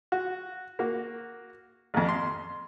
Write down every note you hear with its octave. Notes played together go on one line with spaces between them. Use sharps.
F#4
A#3 F#4
A1 F2
C6